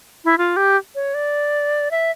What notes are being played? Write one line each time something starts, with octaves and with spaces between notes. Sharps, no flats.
E4
F4
G4
C#5
D5
E5